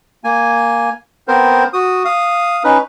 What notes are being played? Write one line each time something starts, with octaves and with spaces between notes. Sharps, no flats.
A#3 G#5
B3 C4 A#4 C5
F#4 D#6
F5 D#6
C#4 D#4 B4